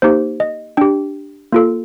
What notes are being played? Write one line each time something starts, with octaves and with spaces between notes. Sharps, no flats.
A#3 D#4 G4 C5
D#5
D4 G4 G5
A#3 F4 A4